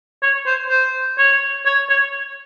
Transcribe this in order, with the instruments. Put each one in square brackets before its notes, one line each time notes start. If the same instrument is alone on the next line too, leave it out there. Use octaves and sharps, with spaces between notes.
[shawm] C#5
C5
C5
C#5
C#5
C#5